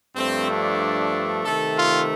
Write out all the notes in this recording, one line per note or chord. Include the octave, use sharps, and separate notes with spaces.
G2 F3 A3 C4
D4
C3 D#3 A3 A4
F4